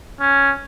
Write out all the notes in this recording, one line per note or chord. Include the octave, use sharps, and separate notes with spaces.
C#4